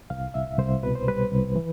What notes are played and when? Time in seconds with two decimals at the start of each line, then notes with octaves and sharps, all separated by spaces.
0.10 C2 F5
0.34 C2 E5
0.58 C2 C5
0.83 B2 B4
0.95 C5
1.08 G3 B4
1.31 C2
1.56 E3